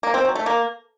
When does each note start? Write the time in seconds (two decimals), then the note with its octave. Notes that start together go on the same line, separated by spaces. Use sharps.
0.03 A#3
0.14 C4
0.25 F#3
0.35 A3
0.46 A#3